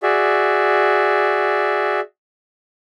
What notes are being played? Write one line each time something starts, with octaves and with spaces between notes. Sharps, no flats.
F#4 G#4 D5 E5